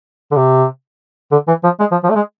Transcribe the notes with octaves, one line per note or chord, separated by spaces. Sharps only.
D3
C3
D3
E3
F3
G#3
F3
F3
A3
G#3